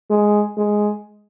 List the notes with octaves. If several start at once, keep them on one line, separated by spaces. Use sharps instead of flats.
G#3
G#3